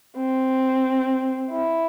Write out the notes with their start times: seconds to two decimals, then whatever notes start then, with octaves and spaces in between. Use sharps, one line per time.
0.17 C4
1.51 E4